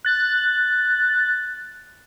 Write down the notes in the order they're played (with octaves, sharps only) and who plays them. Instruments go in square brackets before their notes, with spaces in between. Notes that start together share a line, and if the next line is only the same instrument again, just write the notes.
[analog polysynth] F#6 A6